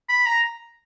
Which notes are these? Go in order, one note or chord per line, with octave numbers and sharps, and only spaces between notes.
B5
A#5